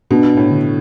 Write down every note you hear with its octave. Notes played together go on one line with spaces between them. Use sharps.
B2 D4
A2
D3